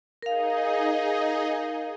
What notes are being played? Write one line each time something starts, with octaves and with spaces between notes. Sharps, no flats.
D#4 G#4 A#4 D#5 F5